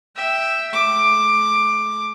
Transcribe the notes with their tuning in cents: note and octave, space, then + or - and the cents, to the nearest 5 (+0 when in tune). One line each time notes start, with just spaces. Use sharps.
E5 +0 G5 +0
A3 -45 D6 +10